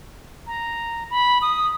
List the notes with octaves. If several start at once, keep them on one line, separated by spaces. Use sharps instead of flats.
A#5
B5
D#6